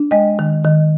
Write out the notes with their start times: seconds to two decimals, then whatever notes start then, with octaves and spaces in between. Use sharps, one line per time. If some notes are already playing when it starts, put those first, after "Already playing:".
Already playing: D4
0.11 G#3 D#5 G5
0.39 D#3
0.64 D#3